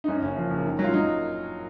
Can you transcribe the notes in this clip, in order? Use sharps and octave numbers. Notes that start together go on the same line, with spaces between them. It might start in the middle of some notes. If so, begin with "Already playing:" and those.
D#4
F#2 C#4
F#1 C#4
F3
F#1
D#3
F#3
F4
F#3 D#4